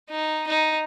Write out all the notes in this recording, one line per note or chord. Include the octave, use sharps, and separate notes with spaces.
D#4
D#4